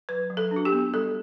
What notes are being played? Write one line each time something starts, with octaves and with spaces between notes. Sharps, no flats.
F#3 B4
F#3
A4
D4
F#4
G4
B3
G3 A4